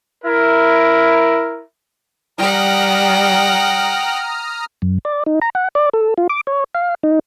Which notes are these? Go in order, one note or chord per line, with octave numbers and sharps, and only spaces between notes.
E4 A#4
G3 F#5 G5 A#5 D#6 F6
F#2
D5
D#4
A#5
F#5
D5
A4
F4
D6
C#5
F5
D#4